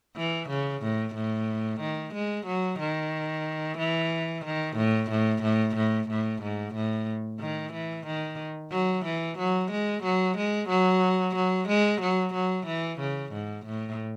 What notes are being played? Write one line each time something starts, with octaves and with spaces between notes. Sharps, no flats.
E3
C#3
A2
A2
D#3
G#3
F#3
D#3
E3
D#3
A2
A2
A2
A2
A2
G#2
A2
D#3
E3
D#3
F#3
E3
F#3
G#3
F#3
G#3
F#3
F#3
G#3
F#3
F#3
E3
C#3
G#2
A2